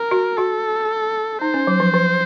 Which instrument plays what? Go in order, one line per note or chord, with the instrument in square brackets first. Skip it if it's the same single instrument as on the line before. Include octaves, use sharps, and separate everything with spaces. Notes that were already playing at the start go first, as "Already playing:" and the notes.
Already playing: [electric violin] A#4
[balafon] F#4
[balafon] F#4 [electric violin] A4
[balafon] D#4 [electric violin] C5
[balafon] C#4
F#3
F3
F3